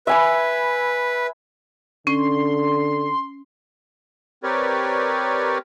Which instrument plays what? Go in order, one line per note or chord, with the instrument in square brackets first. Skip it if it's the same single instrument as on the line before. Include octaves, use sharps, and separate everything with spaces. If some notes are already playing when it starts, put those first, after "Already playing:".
[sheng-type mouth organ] B4 [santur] E5 G#5 B5
[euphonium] D3 [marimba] C#4 [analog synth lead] C6
[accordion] C4 G4 A#4 B4 C#5 D5